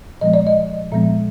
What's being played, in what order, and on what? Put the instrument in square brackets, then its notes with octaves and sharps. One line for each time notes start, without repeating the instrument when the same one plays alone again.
[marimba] A#2 F3 G#3 B3 D#5
D5
D#5
A#2 F3 G#3 B3 E5